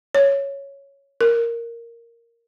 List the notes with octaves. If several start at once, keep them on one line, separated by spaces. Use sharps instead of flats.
C#5
A#4